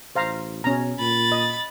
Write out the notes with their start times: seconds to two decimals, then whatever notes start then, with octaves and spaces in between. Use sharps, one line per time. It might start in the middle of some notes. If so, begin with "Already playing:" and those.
0.16 A1 C5 F5 A#5
0.64 B2 C#4 A#5
0.99 A#2 B5 A6
1.32 D#5